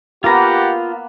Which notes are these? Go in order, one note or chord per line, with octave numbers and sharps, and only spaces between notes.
A#3 B3 F4 G4 B4 F#5 A#5